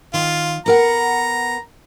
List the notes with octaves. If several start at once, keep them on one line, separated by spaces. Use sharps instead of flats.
D#3 F4
B3 A#4 F#5 A#5